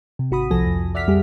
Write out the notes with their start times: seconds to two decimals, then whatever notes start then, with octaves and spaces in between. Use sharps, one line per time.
0.19 C3
0.31 G#1 F#4 B5 D#6
0.51 C2 F3 A4 G#5 A#6
0.66 F2
0.95 D5 E5 F#5 F6 B6
1.08 F2 G3 G4 G#4